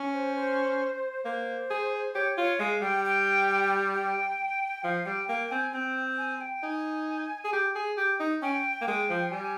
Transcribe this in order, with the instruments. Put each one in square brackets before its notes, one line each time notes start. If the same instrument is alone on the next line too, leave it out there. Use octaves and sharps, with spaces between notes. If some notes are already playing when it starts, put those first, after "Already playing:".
Already playing: [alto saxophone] C#4
[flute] C5
C5
[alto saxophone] A#3 [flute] C5
[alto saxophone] G#4
[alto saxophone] G4 [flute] C#5
[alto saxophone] F4 [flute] C#5
[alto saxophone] G#3 [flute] F5
[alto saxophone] G3 [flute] G5
[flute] G5
G5
[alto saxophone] F3 [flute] F5
[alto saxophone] G3 [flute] G5
[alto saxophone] A#3 [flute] G5
[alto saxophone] C4 [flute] G#5
[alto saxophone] C4 [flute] G5
[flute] G#5
G5
[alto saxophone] D#4 [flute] G#5
[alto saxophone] G#4
G4
G#4
G4
D#4
[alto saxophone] C#4 [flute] G5
[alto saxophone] A#3
[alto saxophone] G#3 [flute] G5
[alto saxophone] F3
[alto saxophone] G3 [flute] G#5